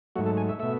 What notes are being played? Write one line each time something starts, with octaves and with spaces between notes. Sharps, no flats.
G#2 F#3 A3 F#4
A4
G#5
E5
B2 A3 E5